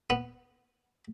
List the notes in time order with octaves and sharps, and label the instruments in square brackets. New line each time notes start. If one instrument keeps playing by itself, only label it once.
[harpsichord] B3